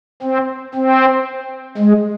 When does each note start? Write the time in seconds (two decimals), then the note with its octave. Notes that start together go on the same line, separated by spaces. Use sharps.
0.23 C4
0.75 C4
1.78 G#3